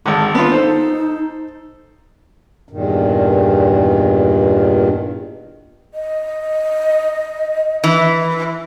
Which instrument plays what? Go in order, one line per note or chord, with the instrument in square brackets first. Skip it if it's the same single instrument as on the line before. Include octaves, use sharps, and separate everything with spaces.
[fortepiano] G#1 D3 [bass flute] G#3
[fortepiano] B3 F4 [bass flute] D4
[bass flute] D#4 [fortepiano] A4 C5
[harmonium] E2 G2 A#2 D#3
[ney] D#5
[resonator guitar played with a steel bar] E3